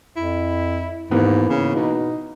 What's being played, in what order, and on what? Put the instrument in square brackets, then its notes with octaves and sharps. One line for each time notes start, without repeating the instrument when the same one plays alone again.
[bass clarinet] F2 [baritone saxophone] E4
[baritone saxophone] D#2 [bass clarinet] G#2 [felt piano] E3 A#3 B3
[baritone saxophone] C#3 [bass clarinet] C#4
[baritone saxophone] B2 [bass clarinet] D#4